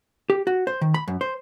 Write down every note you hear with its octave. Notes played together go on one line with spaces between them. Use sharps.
G4
F#4
C5
D#3
B5
F#2
C5